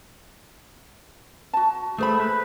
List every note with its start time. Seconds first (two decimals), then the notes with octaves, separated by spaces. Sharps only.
1.53 F#4 A5
1.98 A3 G#4 C5 B5
2.20 B4